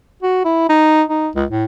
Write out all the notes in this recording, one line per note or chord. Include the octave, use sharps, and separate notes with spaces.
F#4
E4
D#4
D#4
C#2
A2